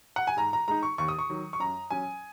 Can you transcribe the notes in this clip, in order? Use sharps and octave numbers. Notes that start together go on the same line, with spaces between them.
F#5
G#5
G#2 A#5
A#5
G#3 D#4 A#5
C#6
D#2 C#6
D#6
C#6
D#3 F#3
C#6
F#2 A#5
F#3 C#4 G#5